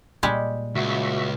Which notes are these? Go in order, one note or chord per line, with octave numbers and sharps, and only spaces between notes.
A#2 G3 G#3
C#2 F#4 E5